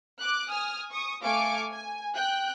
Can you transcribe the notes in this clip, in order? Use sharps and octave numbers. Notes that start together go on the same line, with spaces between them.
D6 F#6
G#5 D#6 F6
C#6 D#6
A3 F5 G#5 C#6 D6 D7
G#5
G5 F#6